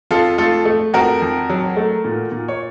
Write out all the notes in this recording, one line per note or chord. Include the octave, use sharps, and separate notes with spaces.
F2 F4 A4
A3 F4 A4
A3
F2 F#4 A#4
F2
F#3
A3
A#2
A#2
C#5